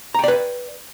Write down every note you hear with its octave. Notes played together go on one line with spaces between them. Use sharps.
B4 D5 G5 A#5